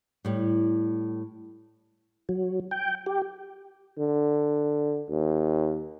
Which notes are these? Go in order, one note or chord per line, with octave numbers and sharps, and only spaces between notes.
A2 G3
F#3
G5
G4
D3
D#2